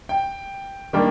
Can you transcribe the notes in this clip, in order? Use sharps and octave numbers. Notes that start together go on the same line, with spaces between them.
G5
D#3 G3 A#3 D4 G5